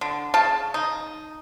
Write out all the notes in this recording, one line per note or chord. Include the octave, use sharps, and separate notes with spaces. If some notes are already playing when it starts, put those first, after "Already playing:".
D3
C#3 A5
D#4